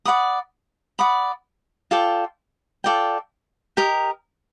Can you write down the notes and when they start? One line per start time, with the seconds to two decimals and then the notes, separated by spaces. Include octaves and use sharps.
0.05 D5 F#5 B5 D#6
0.99 D5 F#5 B5 D#6
1.91 F4 A4 D5 G5
2.84 F4 A4 D5 G5
3.77 G4 A#4 D#5